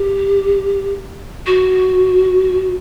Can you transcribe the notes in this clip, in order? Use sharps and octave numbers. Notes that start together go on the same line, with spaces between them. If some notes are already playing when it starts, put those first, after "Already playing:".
Already playing: G4
F#4